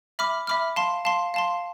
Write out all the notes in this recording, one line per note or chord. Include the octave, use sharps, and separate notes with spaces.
E5 B5 D6 F6
E5 B5 D6 F6
F5 A5 C6
F5 A5 C6
F5 A5 C6